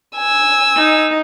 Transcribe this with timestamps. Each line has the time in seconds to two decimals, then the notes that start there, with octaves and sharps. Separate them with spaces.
0.17 G#5 E6
0.77 D#4